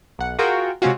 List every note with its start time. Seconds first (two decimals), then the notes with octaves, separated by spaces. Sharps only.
0.19 B1 F#5
0.39 F4 F#4 G#4 A#4 G5
0.82 C3 G#3 C4 C#4 F4 F#4